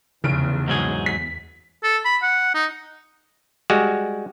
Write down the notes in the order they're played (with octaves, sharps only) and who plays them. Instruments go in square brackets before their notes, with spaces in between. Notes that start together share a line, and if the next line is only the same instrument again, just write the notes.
[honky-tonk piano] F1 D7 [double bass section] E2 [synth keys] C#3
[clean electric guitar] G#2 F#3 G#4
[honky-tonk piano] B6
[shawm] A4
B5
F#5
D#4
[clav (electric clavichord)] G3 G#3 F#4